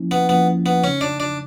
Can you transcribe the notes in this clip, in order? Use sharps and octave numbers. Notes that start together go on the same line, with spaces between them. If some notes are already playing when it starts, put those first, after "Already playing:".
Already playing: F3 A#3 C#4 E4
B3
F3 A#3 B3 C#4 E4
B3
C#3 F#3 A3 C4 C#4 D#4
D4
D4